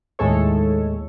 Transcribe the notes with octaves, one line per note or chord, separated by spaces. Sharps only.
D#2 A2 G#3 A4 C#5